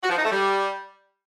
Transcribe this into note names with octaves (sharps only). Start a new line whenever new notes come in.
F#4
F3
D#4
A3
G3